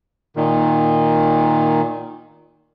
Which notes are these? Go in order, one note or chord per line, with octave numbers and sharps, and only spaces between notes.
A#2 D#3